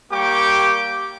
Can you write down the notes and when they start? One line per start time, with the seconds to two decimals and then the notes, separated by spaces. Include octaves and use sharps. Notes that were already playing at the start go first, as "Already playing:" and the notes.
0.12 G3 A#3 G4 G5 C#6 D6